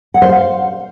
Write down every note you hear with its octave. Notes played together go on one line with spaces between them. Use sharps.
F#5
C5
F5